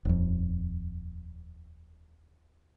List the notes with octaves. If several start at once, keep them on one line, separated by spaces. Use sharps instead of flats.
D#1 F2